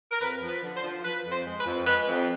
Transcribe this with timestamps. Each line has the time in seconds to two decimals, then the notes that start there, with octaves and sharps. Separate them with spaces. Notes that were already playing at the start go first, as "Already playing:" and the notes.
0.11 A#4
0.21 F2 B4
0.42 F3
0.48 B4
0.63 D3
0.76 C5
0.83 F3
1.04 F3 B4
1.25 F2
1.31 C5
1.45 G#3
1.59 B4
1.66 F2
1.86 G#3 B4
2.07 F2